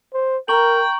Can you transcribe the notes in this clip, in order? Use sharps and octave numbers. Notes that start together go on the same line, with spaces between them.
C5
A#4 G5 A#5 C#6 F#7